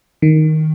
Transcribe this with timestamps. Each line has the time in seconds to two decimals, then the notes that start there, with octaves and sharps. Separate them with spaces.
0.22 D#3